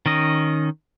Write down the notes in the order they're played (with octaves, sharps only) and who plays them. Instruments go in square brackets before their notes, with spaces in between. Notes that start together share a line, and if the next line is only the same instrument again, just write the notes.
[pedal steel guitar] D#3 C#4 D#5